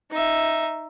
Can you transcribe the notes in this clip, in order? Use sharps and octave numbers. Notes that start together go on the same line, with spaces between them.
D#4 E5